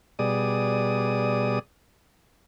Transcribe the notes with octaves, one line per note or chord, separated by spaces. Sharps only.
B2 G3 G#4 D5 D#6